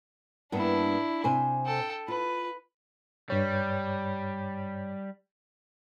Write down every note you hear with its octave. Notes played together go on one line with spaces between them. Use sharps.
G2 A#3 B3 D4 E4
C3 C5 G#5
A4 G5
F4 B4
G2 G3 C#5